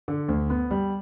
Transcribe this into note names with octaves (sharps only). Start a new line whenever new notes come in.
D3
D2
B3
G3